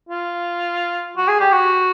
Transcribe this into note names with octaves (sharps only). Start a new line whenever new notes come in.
F4
F#4
G#4
G4
F#4